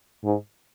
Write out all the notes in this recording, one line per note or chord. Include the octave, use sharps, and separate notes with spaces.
G#2